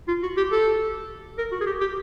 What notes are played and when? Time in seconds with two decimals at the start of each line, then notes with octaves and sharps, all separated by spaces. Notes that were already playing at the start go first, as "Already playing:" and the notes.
0.08 F4
0.23 F#4
0.37 G4
0.52 A4
1.38 A#4
1.52 F#4
1.61 G#4
1.67 G4
1.81 G4